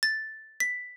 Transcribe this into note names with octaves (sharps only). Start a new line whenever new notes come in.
A6
B6